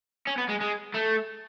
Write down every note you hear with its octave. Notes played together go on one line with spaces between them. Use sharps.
C#4
B3
G#3
G#3
A3